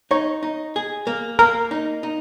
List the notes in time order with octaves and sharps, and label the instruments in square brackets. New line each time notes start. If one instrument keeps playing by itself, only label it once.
[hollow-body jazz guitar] D#4 [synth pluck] C#5
[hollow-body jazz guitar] D#4
G#4
A#3
[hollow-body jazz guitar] A#3 [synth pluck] A#4
[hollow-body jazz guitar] D#4
D#4